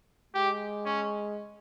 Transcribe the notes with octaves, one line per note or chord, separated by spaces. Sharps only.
G#3 G4
C#4